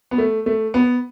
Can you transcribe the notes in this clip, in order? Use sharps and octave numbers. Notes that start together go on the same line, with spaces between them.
B3
A3
A3
B3